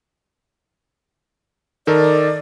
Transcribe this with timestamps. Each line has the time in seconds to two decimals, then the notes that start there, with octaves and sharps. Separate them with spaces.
1.87 D#3 A4 A#4 D5